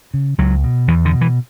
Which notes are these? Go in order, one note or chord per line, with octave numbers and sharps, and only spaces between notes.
C#3
C#2 F#3
B2
E2 E3
D3
B2
E3